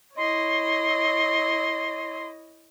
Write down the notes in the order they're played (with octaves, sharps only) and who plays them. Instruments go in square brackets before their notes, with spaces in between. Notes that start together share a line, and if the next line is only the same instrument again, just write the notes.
[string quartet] E4 C#5 D#5 [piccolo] C6